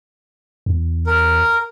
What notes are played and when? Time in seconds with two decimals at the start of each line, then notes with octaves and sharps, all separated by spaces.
0.66 E2
1.07 A#4